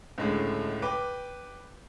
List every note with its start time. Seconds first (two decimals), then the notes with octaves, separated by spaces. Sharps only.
0.18 C#2 A2 D3 G#3 A3
0.82 B4 G5 D6